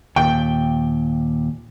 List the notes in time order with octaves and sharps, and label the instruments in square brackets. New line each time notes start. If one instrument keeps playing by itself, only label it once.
[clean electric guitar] D#2 A#2 [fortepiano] G5